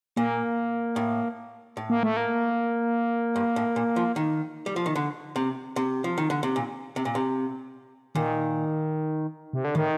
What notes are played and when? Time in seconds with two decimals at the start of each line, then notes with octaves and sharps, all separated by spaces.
0.17 A#2 A#3
0.96 A2
1.77 A2
1.90 A#3
2.03 A3
2.17 A#3
3.36 G2
3.56 A2
3.76 A#2
3.96 F3
4.16 D#3
4.66 G3
4.76 F3
4.86 D#3
4.96 D3
5.36 C3
5.76 C3
6.04 F3
6.18 D#3
6.30 D3
6.43 C3
6.56 A#2
6.96 C3
7.05 A#2
7.15 C3
8.15 A#2 D#3
9.53 C3
9.64 D3
9.75 A2 D#3